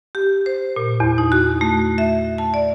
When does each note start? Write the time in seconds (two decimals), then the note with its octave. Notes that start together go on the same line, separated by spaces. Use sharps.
0.15 G4
0.46 C5
0.76 A#2
1.00 E2
1.18 D#4
1.32 F#4
1.61 A3
1.98 E5
2.38 A5
2.54 D5